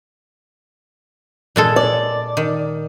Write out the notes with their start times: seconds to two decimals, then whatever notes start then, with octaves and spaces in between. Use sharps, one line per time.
1.56 A#2 G#3 A4
1.76 D5
2.37 D#3